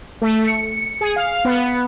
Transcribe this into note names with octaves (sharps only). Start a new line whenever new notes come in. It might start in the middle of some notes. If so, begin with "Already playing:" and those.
A3
C#7
G#4
F5
B3